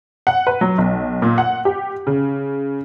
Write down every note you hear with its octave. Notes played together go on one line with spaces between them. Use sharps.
F#5
B4
F#3
B1
A#2
F#5
G4
C#3